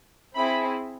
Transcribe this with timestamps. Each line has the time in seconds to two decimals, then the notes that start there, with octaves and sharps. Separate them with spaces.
0.34 C4 E4 G#4 B5